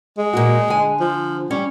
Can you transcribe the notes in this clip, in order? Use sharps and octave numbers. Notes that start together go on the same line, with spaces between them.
G#3
A#2 A#3 F#4
D3 G#5
F3
G3 C#4